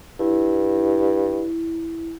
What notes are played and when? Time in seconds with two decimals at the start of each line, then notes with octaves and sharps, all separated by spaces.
0.19 G2 E4